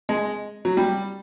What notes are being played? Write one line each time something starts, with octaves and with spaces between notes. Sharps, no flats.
G#3
F#3
G3